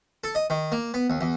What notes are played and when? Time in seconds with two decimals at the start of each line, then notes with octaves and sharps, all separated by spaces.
0.24 A4
0.35 D#5
0.50 D#3
0.72 A#3
0.94 B3
1.10 D#2
1.21 E2